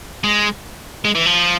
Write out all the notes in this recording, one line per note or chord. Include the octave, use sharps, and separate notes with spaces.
G#3
G#3
E3
F3